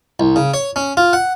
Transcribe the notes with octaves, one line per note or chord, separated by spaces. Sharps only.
C2
C#3
C#5
C#4
F4
F#5